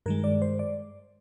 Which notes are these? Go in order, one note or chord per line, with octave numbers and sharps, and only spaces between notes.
G2 D#3 G#3 A#4
D5
C5
D5